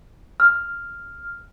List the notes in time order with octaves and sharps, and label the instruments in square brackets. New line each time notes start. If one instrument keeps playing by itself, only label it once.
[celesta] F6